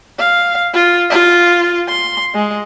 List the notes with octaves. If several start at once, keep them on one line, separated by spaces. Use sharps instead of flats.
F5
F4
F4
C6
G#3